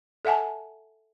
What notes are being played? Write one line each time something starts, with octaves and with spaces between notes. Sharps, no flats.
A4 E5 F#5 G#5 A5